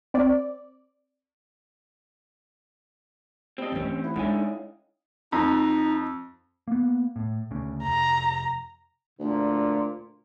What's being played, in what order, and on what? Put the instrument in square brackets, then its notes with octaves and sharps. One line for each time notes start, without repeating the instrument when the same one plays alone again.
[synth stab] C4 D5
[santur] G3 [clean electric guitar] C4 D#5
[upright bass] E3 A3 [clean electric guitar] C4 C#4
[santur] E4 F#5 D#6
[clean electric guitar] G#2 D3 G#5 [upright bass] G#3 D4 [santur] C#4 D5 F5
[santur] D#4 D#6
[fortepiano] F2 [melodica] D#4
[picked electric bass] A#3 B3
A2
D2 C#3
[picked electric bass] F1 [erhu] A#5
[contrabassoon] D2 [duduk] A#2